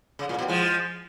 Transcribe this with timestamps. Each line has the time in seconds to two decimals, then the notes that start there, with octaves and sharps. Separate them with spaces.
0.19 C#3
0.29 A#2
0.39 B2
0.48 F3 G#3